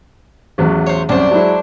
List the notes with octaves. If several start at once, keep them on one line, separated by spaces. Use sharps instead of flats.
A1 E2 F#3
C5 C#5
C2 F#2 D4 C5
F#3 G#3 E4